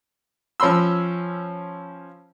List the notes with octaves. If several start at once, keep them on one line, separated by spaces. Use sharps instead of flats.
F3 C#4 B5 C6 E6